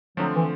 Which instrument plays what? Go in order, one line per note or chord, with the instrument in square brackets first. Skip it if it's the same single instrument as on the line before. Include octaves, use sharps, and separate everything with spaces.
[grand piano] D3 F3 A3 C4 [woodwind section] F#3
[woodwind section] E3